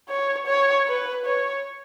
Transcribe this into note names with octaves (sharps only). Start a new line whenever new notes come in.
C#5
C#5
B4
C#5